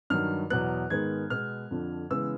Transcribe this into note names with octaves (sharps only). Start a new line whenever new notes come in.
G2 D#3 F#3 F6
E2 B2 F#3 B3 F#6
G#2 D#3 G#3 B3 G#6
B2 G#3 B3 F6
F2 D3 F3
C#3 E3 G#3 B3 E6